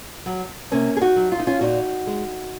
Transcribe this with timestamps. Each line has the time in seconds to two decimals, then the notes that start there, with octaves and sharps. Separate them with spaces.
0.26 F#3
0.71 C3 A#3 C#4
0.97 G#4
1.01 D#4 F#4
1.16 F#3
1.32 F4
1.40 D#4
1.47 C#4 F4
1.61 A#2 D#4 F#4
2.07 G#3